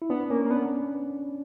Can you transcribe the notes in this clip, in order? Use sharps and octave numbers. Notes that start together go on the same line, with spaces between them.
E4
B3 D4
A#3 C#4
A#3
B3 D4